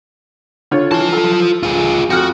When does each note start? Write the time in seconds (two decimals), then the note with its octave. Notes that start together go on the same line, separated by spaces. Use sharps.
0.71 D3 F4 C#5
0.91 E3 F4 A5
1.13 A4
1.63 F4 G#4
2.10 F2 F#4 F6 F#6